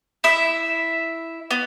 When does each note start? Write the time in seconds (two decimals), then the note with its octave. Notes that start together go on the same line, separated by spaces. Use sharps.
0.24 E4 E5
1.51 B3